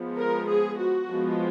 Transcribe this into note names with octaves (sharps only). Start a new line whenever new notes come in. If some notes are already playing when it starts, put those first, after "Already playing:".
Already playing: F3 G#3 B3
A#4
G#4
F#4
F3 G#3 B3